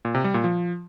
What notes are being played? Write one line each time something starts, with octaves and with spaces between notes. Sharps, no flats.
A#2
C3
G3
A#2
F3